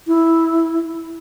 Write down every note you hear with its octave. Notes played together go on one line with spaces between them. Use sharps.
E4